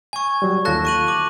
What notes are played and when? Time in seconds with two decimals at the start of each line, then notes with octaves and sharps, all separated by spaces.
0.13 G#5 C#6 G#6
0.42 F#3 G3
0.65 D#2 F4 A4 A5 F#6 A#6
0.85 C#6 D#7 F#7
1.08 D6